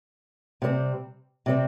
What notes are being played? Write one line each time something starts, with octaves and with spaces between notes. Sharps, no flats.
C3 G3 C4
C3 G3 C4